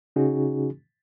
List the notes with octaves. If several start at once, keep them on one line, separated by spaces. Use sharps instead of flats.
C#3 C#4 D#4 F#4 G#4